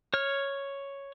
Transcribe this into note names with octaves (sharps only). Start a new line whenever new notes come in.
C#5 F6